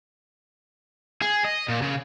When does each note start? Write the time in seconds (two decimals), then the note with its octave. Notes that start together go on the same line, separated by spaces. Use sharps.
1.22 G#4
1.45 D#5
1.69 A#2
1.82 C#3